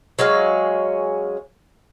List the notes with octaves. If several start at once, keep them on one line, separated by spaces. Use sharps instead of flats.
F#3 G#3 C#4 F5